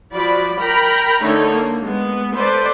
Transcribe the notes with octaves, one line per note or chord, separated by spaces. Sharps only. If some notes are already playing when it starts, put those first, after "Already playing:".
F3 F#4 D5 B5
A#4 G5 A#5 B5
D3 A3 D#4 A4 C#5
A#3
G#3 B3
A4 B4 C5 D5